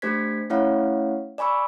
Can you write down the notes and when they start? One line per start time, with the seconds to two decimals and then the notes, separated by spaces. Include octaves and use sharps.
0.02 A3 D4 G4 C5 G#6 B6
0.50 A3 C#4 E4 C#5 F5 F#5
1.38 D5 G#5 B5 C#6 E6